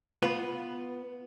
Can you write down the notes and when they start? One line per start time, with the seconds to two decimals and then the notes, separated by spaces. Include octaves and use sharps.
0.22 B3 F4 B4